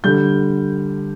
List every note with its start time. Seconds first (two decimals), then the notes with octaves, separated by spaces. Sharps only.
0.04 D3 G3 G6